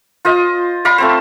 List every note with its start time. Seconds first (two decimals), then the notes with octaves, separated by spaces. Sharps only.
0.25 F4 C5 D#5
0.85 D5 F5 A#5 B5
0.98 A3 C4 C5